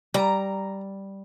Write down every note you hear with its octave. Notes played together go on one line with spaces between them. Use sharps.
G3 A#5